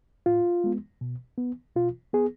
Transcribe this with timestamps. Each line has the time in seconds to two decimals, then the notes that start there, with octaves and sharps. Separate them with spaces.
0.26 A2 F4
0.64 G#3 B3
1.01 B2
1.38 B3
1.76 B2 F4
2.13 B3 G#4